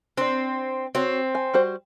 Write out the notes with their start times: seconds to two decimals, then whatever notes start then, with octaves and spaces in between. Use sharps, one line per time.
0.17 C4 D4 D5
0.95 C4 F#4 C#5
1.35 G#5
1.54 G3 F#4 C5